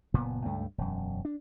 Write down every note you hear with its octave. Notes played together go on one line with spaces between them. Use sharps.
F#1 A#2 B3
C#2 G2 A3
E1 F#2
D4